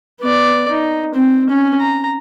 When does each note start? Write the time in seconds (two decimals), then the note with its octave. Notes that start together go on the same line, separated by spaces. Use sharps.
0.21 B3 D5
0.71 D#4
1.15 C4
1.50 C#4
1.80 A#5